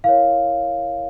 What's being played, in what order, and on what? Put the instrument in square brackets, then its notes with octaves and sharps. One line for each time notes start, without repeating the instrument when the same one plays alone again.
[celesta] E4 A#4 C#5 F5